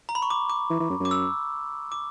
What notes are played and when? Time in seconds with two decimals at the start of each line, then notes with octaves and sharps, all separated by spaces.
0.09 A#5
0.15 B5
0.22 C#6
0.30 D6
0.50 D6
0.70 E3
0.80 E3
0.90 F#2
1.00 F#2
1.05 D6
1.11 E6
1.92 D6